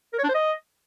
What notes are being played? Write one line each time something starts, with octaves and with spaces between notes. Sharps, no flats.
A#4
C#5
D4
C5
D#5